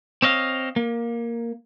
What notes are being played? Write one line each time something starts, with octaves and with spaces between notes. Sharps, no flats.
C4 C#5 D#5 F5
A#3